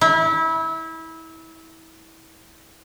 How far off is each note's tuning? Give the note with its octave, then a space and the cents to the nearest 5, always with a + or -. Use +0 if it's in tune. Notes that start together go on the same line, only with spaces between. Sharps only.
E4 -25